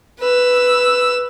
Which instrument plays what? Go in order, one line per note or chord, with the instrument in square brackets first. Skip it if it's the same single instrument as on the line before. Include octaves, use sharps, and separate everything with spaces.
[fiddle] B4 E6